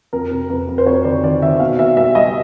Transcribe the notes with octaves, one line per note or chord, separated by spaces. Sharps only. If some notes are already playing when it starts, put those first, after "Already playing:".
F2 A#4
C3
F2 B4
F2
C5
F2 C#5
D#3 D5
D#3 D5
D#3 E5
B2 F5
B2 E5
G3 E5
G3 D#5